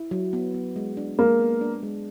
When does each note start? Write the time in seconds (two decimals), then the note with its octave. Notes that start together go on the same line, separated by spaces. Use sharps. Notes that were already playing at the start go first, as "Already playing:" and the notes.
Already playing: E4
0.11 F#3
0.33 B3
0.54 B3
0.76 G#3
0.97 D4
1.19 G#3 A#3
1.40 B3
1.61 D4
1.83 G#3